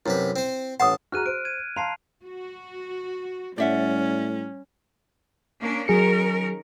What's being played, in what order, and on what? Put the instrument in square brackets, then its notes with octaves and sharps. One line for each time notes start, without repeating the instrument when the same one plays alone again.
[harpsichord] F#2 C3 B4 [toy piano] E4
[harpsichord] C4 C5
[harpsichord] A1 A5 [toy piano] F#5 D#6
[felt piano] F#4 G#4 A#5 [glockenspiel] F6 F#6 D#7
[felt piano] C5 [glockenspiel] D7
[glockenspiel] G#6 D#7
[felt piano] F5 A#5 C6 [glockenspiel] A5 C7 F7
[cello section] F#4
[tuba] A2 [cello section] G3 [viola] C#4 [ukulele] D5 E5 F#5
[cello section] A#3 C#4 D4
[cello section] D#3 C#4 A#4 [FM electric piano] F#3 G#4 C#7